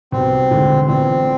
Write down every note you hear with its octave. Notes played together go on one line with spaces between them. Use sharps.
C2 B2 B3 C4
E1 D2 D3 G#3
A2 E3 B3 C4 D4 F4